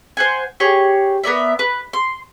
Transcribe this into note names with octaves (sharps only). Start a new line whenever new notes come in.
C5 F#5 G#5
G4 G#4 C#5
B3 A#4 D5 E5
B4
C6